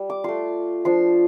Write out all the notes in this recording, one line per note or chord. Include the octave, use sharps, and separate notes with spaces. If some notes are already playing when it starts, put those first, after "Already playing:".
Already playing: G3
D6
A3 F4 C6
F3 D4 F4 C6